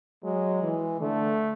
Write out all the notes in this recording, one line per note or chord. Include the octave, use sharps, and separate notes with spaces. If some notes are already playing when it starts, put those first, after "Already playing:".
F#3 G#3
E3
D3 A3